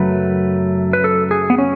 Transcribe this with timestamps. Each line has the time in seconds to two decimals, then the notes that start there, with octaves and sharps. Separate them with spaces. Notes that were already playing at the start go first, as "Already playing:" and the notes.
Already playing: F#2 C#3 F#3 A3 B4
0.93 B4
1.04 A4
1.31 G#4
1.50 B3
1.58 C#4